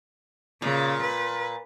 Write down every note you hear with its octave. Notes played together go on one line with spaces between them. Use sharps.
A#2 C#3
B4